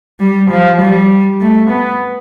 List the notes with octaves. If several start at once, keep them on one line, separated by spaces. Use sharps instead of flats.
G3
F3
G3
A3
B3